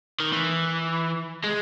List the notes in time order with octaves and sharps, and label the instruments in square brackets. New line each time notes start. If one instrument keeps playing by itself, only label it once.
[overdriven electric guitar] D#3
E3
G#3